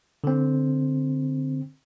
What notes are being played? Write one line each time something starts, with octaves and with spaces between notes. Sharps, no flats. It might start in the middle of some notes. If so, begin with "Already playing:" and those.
D3 C4